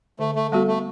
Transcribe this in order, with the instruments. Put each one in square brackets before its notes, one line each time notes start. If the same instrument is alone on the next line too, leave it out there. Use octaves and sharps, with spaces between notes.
[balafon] D3 [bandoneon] A3
[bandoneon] A3
[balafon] G3 B3 F#4 A4 [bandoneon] A3
[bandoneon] A3